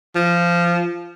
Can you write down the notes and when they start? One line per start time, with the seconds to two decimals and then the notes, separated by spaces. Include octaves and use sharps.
0.15 F3